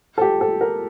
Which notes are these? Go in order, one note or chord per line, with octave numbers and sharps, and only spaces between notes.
A4
G4
A4
A#4